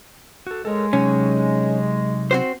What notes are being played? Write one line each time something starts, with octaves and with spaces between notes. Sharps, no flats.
F#4 A4
G#3 A4 A#4 C#5
C3 F#3 C#4 D#4
C4 F#4 C5